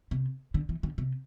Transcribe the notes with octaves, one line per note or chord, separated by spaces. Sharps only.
C3
D3
E3
D3
C3